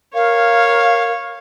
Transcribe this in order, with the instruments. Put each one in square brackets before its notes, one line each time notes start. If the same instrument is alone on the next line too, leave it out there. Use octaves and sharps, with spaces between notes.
[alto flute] A#4 [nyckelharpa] C#5 [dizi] F5